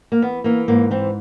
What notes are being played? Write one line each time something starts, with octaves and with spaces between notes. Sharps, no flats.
A#3
E3 B3
E3 A#3
G#2 A#3
E3 C4